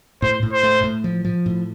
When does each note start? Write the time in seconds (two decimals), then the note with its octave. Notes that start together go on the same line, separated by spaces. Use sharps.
0.22 A2 C5
0.43 A2
0.53 C5
0.63 A3
0.83 A2
1.04 F3
1.25 F3
1.46 A2